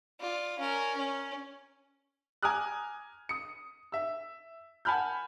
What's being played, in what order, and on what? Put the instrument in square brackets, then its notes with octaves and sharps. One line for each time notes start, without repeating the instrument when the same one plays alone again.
[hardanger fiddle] F4 D5
C#4 A#4
C#4
[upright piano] G#5 A#5 D6 D#6 F6 F#6
D#6 C#7
E5 E6
F#5 G#5 A5 B5 F6 G6